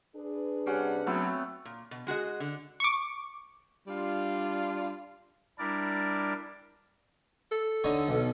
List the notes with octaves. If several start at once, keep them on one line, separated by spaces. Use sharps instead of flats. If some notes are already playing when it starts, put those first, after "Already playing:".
D4 G#4 B4
C3 G3 C#4 F#5
F#3 A3 B3 C4
A#2
B2
G#3 F#4 G#4 D#5
D3
C#6 D6
G3 D4 F4
G3 D4 E4 A#4 D5
A4
D3 D#4 C#5
B1